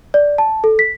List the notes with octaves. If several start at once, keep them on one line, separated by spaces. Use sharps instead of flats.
D5
A5
A4
B6